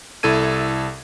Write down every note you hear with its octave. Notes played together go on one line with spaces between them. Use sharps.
C2 E4 A4 G#6 D#7